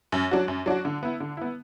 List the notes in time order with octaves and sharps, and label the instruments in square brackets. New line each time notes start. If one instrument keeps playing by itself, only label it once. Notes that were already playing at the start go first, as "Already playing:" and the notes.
[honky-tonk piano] F#2
F#3 D4 F#4
F#2
F#3 D4 F#4
D3
B3 E4
D3
B3 E4